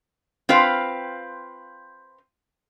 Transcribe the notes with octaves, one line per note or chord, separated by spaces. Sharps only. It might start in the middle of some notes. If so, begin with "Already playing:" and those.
C4 F4 B4 F5